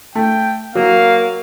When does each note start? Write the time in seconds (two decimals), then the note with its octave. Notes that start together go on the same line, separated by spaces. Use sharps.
0.15 A3 G5
0.75 F#3 A#3 F5